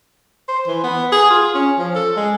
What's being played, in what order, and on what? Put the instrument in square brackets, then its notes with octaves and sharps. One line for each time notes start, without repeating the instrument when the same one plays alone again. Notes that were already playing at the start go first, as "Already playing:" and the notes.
[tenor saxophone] C5
E3
B3
G#4
F4
C#4
F3
A4
G#3